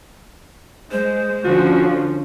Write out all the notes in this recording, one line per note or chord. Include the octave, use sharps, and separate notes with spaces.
G#3 C5
D3 F3 C#4 F#4